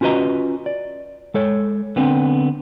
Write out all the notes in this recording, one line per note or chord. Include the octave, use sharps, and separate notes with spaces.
C#4 F4 F#4 B4 D#5 A#5
D5
G#3 A4 C#5
D3 B3 C4 D4